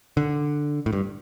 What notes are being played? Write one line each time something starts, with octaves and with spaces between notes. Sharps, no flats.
D3
A2
G2